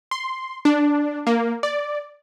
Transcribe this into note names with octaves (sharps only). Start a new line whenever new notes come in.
C6
D4
A#3
D5